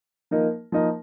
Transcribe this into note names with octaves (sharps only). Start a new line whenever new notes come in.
F3 A#3 D#4 A#4 D#5
F3 A#3 D#4 A#4 D#5